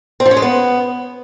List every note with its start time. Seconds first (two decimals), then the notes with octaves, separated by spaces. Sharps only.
0.20 C4
0.26 F3
0.31 C#4
0.37 G#3
0.42 B3